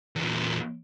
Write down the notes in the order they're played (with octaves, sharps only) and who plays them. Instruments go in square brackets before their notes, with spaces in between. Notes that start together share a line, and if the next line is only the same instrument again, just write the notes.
[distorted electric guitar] E2 A#2